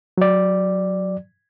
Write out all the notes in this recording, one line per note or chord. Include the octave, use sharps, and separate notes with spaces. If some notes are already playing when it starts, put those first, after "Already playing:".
F#3 D5